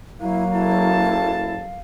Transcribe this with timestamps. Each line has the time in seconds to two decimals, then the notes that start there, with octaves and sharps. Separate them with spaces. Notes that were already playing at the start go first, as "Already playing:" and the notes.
0.20 F#3 A#3 E4 F5
0.53 F#1 E4 A4 A5